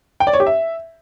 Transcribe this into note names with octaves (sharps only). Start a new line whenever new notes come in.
G5
D5
C#5
G4
E5